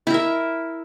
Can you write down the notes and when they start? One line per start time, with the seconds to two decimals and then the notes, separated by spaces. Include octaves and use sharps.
0.07 E4
0.10 A#4
0.14 E5